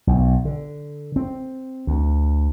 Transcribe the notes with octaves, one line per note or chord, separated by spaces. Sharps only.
B1
D3
C4
D2